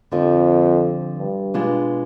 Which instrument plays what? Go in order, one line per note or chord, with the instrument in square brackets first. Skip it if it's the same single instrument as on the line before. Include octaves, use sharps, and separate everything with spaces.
[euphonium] F2 [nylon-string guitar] D3 F3 C4 G4
[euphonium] G2
[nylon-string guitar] B2 G#3 D4 F4